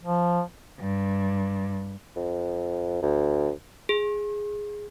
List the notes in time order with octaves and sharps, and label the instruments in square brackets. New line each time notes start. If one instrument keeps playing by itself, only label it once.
[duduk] F3
[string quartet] G2
[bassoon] F2
D2
[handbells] G#4